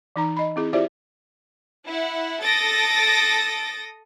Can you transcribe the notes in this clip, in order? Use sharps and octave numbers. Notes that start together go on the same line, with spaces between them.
E3 D#4 A#5
D#5 B5
C4 E4 G#4
E4 F4 G4 C5 D5 E5
E4 F#5
A4 D#6 A6 A#6 D7